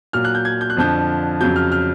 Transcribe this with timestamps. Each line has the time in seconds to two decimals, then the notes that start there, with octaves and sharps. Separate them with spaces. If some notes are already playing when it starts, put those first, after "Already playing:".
0.13 A#2 F#3 F6
0.25 F#6
0.35 G6
0.45 G#6
0.61 G6
0.70 F#6
0.77 F2 D3 F3 G6
1.40 F2 C#3 F#3 G6
1.56 F6
1.72 F6